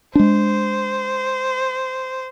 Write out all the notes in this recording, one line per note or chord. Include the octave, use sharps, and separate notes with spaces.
G#3 D4 C5